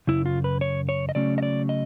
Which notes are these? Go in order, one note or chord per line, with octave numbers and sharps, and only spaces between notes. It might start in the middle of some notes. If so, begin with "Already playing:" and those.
F#2 C#3 E4
F4
B4
C#5
C#5
D#5
C#3 F#3 A3 C#4 D5
D#5
D5
D#5